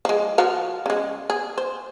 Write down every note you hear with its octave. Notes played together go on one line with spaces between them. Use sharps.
F3 G#3
F3 F#4 F5
C#3 G#3
G#4
C5